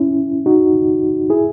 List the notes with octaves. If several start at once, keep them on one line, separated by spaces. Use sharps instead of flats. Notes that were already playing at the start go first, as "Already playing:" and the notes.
Already playing: C#4 E4
D#4 F#4
E4 G#4